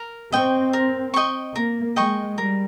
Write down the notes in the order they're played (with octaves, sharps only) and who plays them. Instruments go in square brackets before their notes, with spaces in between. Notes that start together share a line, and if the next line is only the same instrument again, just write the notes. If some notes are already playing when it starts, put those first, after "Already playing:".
Already playing: [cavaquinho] A#4
[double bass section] C4 [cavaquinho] D#5 G5 C#6
[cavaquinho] A#4
D#5 G5 C#6
[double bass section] A#3 [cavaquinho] A#4
[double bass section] G#3 [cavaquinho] D#5 G5 C#6
[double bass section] G3 [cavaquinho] A#4